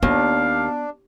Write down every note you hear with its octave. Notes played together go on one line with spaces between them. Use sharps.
D#2 B3 D4 F4 F5